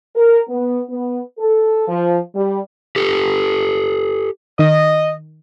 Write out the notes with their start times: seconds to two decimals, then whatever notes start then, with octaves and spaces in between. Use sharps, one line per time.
0.16 A#4
0.49 B3
0.90 B3
1.38 A4
1.88 F3
2.35 G3
2.96 G4 A4
4.59 D#3 D#5